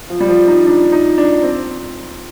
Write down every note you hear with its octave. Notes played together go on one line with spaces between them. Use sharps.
F3
G3
F3
D#4
D4
D#4
D4
C4